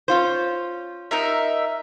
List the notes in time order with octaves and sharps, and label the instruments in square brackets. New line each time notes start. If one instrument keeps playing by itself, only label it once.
[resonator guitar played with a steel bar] C#4 F4 C5
[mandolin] D#4 A#4 E5